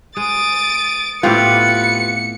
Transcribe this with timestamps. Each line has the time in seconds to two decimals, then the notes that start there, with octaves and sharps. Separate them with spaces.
0.17 G#3 D#6 A6 D7
1.23 A2 B3 C4 F4 G4 B4 C#7